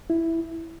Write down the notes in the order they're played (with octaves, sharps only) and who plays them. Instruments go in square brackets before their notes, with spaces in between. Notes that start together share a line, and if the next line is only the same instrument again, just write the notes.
[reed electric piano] E4